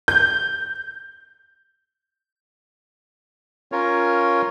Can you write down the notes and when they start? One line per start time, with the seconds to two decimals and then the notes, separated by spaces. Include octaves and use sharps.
0.08 G6
3.72 C#4 F4 A#4 C#5